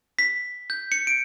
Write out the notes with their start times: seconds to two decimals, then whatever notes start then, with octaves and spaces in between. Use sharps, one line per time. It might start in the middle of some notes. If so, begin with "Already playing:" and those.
0.19 B6
0.70 G6
0.92 C#7
1.07 D7